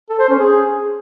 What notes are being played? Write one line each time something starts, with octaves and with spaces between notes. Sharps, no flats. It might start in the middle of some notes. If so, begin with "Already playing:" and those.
A4
C5
C#4
G#4